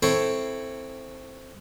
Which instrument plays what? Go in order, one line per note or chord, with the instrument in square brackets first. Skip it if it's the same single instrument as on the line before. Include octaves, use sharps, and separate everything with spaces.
[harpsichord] C4 E4 A4 C5 C#5